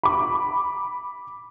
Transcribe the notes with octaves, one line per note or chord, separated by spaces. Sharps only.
B5 D6